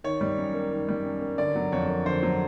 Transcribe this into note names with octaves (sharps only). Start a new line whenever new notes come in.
D#3 C#5
G3
F#2
A#3
D#3
G3
F#2
A#3
D3 D5
F#3
F2 C#5
A#3
D3 C5
F#3